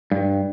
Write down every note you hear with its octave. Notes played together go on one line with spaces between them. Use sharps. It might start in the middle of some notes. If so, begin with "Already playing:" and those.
G2